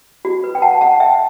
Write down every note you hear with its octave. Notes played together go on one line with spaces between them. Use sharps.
F#4
B4
G5
F#5 A5
F#5 A5
E5 G5